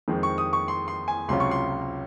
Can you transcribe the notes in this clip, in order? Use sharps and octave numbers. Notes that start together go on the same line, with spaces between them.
F2 D#3 G#3 C4
C#6
D#6
C#6
C6
C6
G#5
C#2 C3 F#3 C#4 F4 C6
C#6
C6